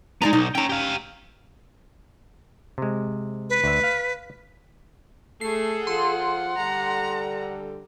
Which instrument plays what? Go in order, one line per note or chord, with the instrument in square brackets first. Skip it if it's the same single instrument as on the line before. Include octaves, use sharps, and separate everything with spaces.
[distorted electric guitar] G#3 B3 [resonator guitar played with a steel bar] D#4 D5 A#5
[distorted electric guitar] B1 [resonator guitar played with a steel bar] D#4
[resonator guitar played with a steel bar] C#4 A#5 [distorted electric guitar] C#5 G5
[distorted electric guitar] G4 F5
[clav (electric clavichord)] C3 G#3
[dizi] B4
[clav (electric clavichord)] D2 E5
F5
[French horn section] A3 [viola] G#4 A4 [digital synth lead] C7
[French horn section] F3 F4 [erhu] F#5 [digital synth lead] C6
[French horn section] D3 G3 A4 [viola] A#5